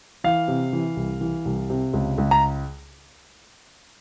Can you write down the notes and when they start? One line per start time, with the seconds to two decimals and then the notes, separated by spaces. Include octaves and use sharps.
0.24 E3 F5
0.48 C3
0.73 E3
0.97 C2
1.21 E3
1.45 C2
1.70 C3
1.93 C#2
2.18 C#2
2.31 A#5